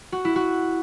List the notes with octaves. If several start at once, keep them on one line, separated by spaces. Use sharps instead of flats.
F#4
E4
F#4